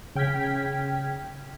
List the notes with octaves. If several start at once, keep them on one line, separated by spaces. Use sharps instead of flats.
C#3 G5 F6 G#6 B6